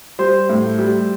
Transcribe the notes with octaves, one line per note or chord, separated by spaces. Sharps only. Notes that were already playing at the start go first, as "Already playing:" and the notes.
G3 C5
A2
G3